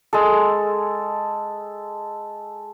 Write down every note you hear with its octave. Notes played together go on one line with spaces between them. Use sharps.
G#3 A4